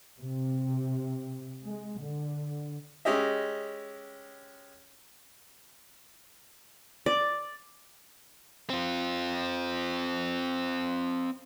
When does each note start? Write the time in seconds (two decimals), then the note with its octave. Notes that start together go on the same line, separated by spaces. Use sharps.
0.19 C3
1.64 G#3
2.00 D3
3.05 G#3 C#4 G4 D#5 E5
7.06 D5
8.70 C4 F4